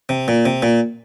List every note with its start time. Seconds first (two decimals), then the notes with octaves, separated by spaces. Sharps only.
0.09 C3
0.28 A#2
0.46 C3
0.62 A#2